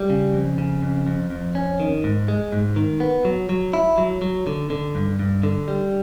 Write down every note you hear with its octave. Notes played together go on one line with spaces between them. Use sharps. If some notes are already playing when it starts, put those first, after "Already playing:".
Already playing: G3
C#3
F2
C#3
F2
F2
F2
C#4
D#3
G#2
G#3
G#2
D#3
B3
F#3
F#3
E4
F#3
F#3
D3
D3
G2
G2
D3
G3